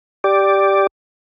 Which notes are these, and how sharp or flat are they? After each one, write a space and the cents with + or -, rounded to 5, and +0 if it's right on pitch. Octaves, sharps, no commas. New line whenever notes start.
G4 +0 D5 +0